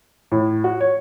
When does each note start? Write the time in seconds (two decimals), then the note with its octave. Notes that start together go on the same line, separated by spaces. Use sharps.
0.32 A2
0.64 F#4
0.81 C#5